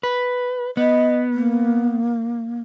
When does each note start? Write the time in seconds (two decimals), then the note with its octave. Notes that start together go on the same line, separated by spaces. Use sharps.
0.03 B4
0.77 B3 D#5
1.34 A#3